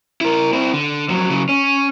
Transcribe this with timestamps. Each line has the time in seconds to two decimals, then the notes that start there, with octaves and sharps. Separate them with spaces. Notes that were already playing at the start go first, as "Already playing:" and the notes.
0.21 E4 A#4
0.53 C4 E4
0.73 D3
1.09 F2 F#3
1.30 C#3 F#3
1.49 C#4